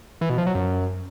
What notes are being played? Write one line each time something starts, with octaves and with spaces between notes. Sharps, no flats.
E3
B2
F3
F#3
F#2